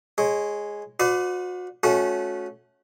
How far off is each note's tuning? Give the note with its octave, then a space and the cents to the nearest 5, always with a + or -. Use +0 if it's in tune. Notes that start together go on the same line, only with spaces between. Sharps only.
G#3 +0 C#5 -20
F#4 -35 B4 +40 D5 +0
A3 -25 C#4 +0 F#4 -30